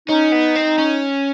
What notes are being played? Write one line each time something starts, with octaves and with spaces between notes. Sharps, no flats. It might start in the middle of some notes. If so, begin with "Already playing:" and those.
C#4 D#4
B3
C4
C#4